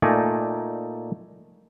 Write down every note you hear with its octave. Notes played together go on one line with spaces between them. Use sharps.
A#2 A3 D#4 D5 G#5 A#5